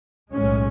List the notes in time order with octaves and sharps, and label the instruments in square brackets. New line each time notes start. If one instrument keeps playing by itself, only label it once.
[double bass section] B1 A2 G#3 C#4